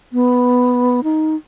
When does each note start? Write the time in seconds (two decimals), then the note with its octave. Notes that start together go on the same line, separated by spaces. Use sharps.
0.13 B3
1.04 D#4